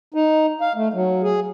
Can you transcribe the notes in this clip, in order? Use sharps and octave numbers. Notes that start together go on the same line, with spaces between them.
D#4
F5
A3
F#3
G#4